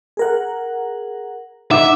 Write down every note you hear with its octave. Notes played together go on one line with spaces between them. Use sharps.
G#4 A#4 F#5
D#4 E5 F#5 D6